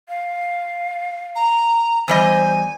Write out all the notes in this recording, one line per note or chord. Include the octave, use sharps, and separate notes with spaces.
F5
A#5
E2 G3 C5 D#5 G#5